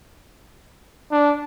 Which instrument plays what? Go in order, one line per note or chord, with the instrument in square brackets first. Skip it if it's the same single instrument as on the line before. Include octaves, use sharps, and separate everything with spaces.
[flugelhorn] D4